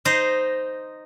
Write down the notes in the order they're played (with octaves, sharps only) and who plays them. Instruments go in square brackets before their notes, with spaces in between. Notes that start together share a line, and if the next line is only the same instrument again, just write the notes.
[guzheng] D#4 C5 D#5